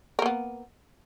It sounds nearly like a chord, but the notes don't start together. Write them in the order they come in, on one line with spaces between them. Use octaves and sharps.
A#4 A#3 B3